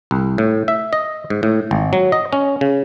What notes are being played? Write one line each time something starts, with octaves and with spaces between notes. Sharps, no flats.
C2
A2
E5
D#5
G#2
A2
G#1
F#3
D#5
C#4
C#3